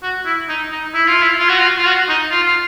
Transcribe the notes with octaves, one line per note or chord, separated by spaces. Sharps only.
F#4
E4
D#4
D#4
E4
F4
E4
F4
F#4
F4
F4
F#4
D#4
F4
F4